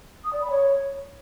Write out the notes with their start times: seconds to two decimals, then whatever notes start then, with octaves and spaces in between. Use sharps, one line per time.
0.24 D#6
0.32 D5
0.41 B5
0.50 C#5